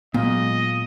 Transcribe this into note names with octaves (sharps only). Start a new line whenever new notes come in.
A#2 F#3 G#3 B3 D#5